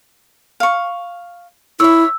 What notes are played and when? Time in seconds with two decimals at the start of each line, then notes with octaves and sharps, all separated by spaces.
0.60 F5 C#6
1.80 E4 C#5 E5 E6